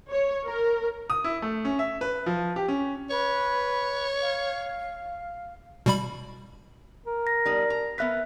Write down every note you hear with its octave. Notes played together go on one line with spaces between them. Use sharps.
C#5
A#4
D#6
E4
A3
C#4
E5
B4
F3
G4
C#4
B4 C#5
F5
B2 G3 B5
A#4
A#6
G3 B3 D#4
A#5
B3 A#4 B4 E5 F#6 B6